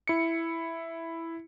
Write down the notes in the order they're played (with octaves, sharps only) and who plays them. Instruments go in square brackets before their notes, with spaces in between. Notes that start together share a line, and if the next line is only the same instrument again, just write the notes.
[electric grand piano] E4 C#7